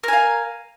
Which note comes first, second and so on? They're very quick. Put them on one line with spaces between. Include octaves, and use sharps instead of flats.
A#4 G#5 F5